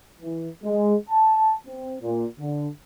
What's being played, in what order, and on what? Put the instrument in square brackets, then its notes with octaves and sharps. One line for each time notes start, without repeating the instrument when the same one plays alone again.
[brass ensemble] E3
G#3
A5
C4
A#2
D3